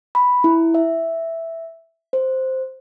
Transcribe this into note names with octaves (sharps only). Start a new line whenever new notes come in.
B5
E4
E5
C5